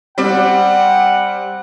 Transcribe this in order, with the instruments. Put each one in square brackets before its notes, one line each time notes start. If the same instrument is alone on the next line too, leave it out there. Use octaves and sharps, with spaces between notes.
[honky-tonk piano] G3 C4 D5 [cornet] F#5